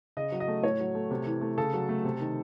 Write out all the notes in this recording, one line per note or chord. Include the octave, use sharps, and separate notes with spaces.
C#3 D#5
F#3
D#5
A3
A2 C#5
F#3
A3
C3
E3
A3
C#3 A4
F#3
A3
C3
D#3